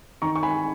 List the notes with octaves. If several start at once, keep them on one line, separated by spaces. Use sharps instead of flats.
D#3 A#5 C#6
C#6
G#5 B5